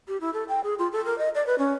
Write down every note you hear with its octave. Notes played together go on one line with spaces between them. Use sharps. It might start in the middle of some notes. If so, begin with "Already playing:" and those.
G4
E4
A4
G5
G#4
F4
A4
A#4
D#5
D5
B4
C#4